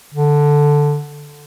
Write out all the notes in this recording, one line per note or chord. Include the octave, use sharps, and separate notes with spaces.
D3